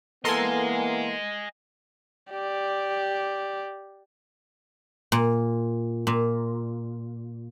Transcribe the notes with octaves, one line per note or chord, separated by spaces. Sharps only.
E3 A#3 B3 A4 A#4 D#5 G#5 C6
G4 D5
A#2
A#2